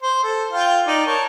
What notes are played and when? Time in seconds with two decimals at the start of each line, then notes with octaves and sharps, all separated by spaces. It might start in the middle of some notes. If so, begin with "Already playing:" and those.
0.02 C5
0.24 A4
0.52 F4 F5 G5
0.87 D#4 D5
1.06 A#4 C#5 A5